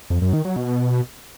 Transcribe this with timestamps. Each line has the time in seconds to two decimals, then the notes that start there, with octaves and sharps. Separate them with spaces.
0.10 F2
0.22 F#2
0.33 D#3
0.45 F#3
0.56 B2